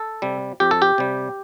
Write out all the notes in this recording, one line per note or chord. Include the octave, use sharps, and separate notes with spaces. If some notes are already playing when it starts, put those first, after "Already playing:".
Already playing: A4
C3 G3
F2 G4
A4
G4
C3 G3